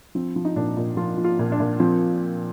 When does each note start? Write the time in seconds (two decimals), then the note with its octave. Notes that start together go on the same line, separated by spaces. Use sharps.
0.15 F3 C4
0.36 F3
0.45 D#4
0.56 A#2 D4
0.77 A#2
0.97 F3 F4
1.17 F3
1.24 F4
1.39 A#2
1.52 D4
1.60 A#2
1.80 F3 C4